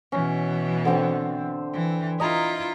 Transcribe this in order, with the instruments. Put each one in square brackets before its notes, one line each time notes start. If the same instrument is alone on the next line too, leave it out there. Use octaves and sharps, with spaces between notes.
[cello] B2 E3 [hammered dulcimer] C#4
[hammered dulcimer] D3 C4 E5
[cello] E3
[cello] E4 F4 [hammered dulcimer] D#5 A#5 B5